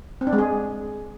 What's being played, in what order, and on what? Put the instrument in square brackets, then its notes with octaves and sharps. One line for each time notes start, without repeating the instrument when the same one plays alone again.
[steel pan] C4
D4
G#3
G#4